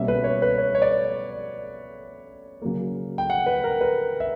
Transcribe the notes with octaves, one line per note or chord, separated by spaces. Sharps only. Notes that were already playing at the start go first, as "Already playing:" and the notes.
Already playing: B2 G3 A#3 C#4 E5
B4
C#5
B4
C#5
C#5
D5
C#3 F#3 A#3
G5
F#5
B4
A#4
B4
E5